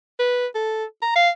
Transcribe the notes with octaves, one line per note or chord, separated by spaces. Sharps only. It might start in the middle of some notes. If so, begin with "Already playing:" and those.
B4
A4
A#5
F5